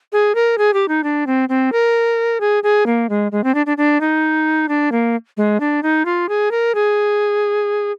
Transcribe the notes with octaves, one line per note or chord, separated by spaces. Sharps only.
G#4
A#4
G#4
G4
D#4
D4
C4
C4
A#4
G#4
G#4
A#3
G#3
G#3
C4
D4
D4
D4
D#4
D4
A#3
G#3
D4
D#4
F4
G#4
A#4
G#4